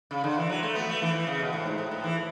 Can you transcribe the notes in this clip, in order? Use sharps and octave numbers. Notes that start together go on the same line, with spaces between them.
C#3
D3
E3
F#3
A3
B3
A3
E3
E3
C#3
B2
A2
G#2
A2
A2
E3